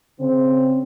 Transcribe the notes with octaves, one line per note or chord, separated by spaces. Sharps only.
C#3 C4